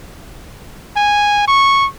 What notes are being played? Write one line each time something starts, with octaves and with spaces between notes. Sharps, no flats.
G#5
C#6